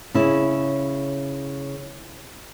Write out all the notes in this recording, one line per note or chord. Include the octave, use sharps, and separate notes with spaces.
C#3 E4